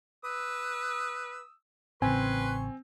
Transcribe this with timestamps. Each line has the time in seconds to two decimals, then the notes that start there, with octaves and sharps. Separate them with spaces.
0.24 B4 D#6 E6
2.02 A1 C#3 C4 B4 G#5 C6 C#6